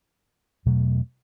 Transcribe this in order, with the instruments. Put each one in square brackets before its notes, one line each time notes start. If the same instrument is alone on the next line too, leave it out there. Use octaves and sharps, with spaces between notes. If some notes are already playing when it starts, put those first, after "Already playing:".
[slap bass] E2 B2 F#3 A3